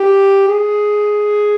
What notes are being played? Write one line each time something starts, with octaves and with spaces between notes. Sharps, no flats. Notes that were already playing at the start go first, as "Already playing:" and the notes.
Already playing: G4
G#4